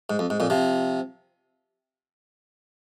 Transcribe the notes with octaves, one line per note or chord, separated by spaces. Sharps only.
G#2
F2
G#2
F2 A#2
C3 F3